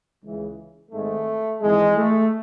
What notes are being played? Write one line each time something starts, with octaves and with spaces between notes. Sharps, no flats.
C#2 C#3 E3
G#1 G#2 D#3 A3
G#1 G#2 E3 G#3
A3